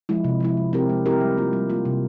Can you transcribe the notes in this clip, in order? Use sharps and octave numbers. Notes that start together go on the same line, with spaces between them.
F3 G#3 E4
C3
F3 G#3 E4
G#3
C4 E4 G4 A#4
G#3
C4 E4 G4 A#4
G3
A#3 F4
G3
A#3 F4
C3